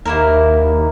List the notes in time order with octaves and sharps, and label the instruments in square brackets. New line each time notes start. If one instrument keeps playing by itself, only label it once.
[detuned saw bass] D#2 [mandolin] A#3 E4 A#4